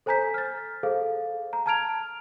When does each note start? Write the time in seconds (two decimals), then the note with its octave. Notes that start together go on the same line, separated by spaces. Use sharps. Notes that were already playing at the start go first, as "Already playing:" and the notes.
0.06 A4 C5 G#5 A#5 G6 B6
0.34 F6 A6
0.83 G#4 A4 C5 F5
1.53 A#5
1.66 A5 A#5 F6 G#6 D7 F7